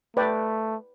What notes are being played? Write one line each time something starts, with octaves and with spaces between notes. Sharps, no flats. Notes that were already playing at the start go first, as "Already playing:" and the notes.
A3 B4 D5 G5